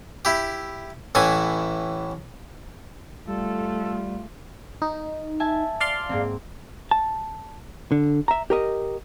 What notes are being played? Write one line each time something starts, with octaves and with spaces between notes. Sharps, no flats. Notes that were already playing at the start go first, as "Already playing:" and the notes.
E4 G4
A1 A2 E3 G#5
G3 A3 F4 A4
D#4
E5 G#5 A5
D5 F5 C6
G#2 A#3 C4
A5
D3
E5 A#5
G4 A#4 D#5